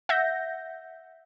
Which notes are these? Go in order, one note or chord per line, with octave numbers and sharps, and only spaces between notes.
E5 F#5 G6 A#6